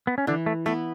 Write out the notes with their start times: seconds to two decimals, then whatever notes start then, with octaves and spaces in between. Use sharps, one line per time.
0.07 B3
0.18 C#4
0.27 D3 E3 D4
0.46 A3
0.66 A3 B3 E4 B4